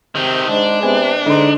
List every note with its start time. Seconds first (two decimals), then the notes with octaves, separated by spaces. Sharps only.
0.15 C3 D#3 C4
0.48 G#2 G#3 D4
0.83 C3 B3 G#5
1.26 G#2 D3 D#4 C6